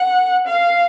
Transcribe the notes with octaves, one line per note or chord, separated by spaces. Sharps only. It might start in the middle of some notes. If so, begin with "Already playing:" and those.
Already playing: F#5
F5